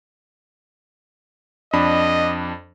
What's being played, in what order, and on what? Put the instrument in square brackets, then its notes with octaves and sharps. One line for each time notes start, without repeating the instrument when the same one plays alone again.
[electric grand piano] F2 D4 B5 [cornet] D#5